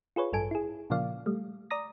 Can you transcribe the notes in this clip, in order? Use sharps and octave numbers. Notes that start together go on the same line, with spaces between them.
F4 G#4 B4 C#5
A1 G2 A4 G#5 D7
E4 G#4
A#2 C#3 F3 A#3 D5 F5
G3 A3
D5 A#5 D#6 A#6